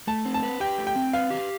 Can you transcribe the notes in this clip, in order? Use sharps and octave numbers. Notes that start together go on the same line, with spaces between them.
A3 A5
C4
A5
B4
G4 G5
A3
G5
C4
B4 F5
G4